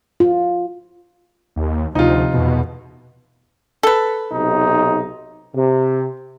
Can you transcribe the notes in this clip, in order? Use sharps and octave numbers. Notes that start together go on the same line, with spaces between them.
F4
D#2
D2 C3 F3 D#4 F4
E2 B2
A4 B4
B1 C3 D#4
C3